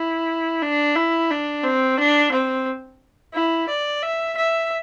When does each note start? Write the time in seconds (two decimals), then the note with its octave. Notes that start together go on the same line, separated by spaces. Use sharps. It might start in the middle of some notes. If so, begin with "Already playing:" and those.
Already playing: E4
0.62 D4
0.96 E4
1.30 D4
1.63 C4
1.98 D4
2.32 C4
3.34 E4
3.69 D5
4.03 E5
4.37 E5